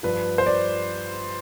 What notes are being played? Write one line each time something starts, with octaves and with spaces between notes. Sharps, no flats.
G2 F3 B4
C5
D5